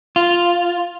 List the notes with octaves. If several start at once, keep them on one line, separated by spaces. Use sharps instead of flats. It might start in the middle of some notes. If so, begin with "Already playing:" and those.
F4